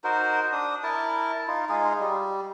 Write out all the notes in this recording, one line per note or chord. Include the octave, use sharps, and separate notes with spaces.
D#4 F#4 A#4 C5
D4 D#6
E4 A#4 A5
D#4 F4
G#3 D#4 F4 G#4
G3